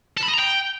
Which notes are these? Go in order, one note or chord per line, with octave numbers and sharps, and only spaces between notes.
A4
B5
D#5
A#5
G5